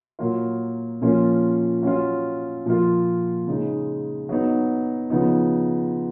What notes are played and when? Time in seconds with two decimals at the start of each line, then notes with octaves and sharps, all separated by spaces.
0.19 A#2 F#3 A#3 F4
1.01 A#2 F3 A#3 C#4 F4
1.83 F#3 C#4 F4
2.65 A#2 F3 A#3 F4
3.47 C#3 G#3 D#4
4.29 F#3 B3 D#4
5.10 C#3 F3 B3 D#4